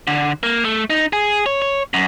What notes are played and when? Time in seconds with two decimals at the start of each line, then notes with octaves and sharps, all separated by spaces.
0.07 D3
0.43 A#3
0.65 A3
0.90 D#4
1.13 G#4
1.46 C#5
1.62 C#5
1.94 F#2